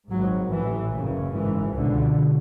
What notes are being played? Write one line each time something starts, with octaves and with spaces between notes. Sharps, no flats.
G#1 G#2 F#3
A1 A2 E3
F#1 F#2 C#3
G#1 G#2 E3
C#2 B2 D3